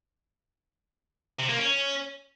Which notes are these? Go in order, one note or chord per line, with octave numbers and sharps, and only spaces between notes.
C3
A#3
C#4